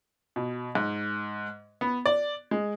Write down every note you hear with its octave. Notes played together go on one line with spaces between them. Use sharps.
B2
G#2
B3
D5
G#3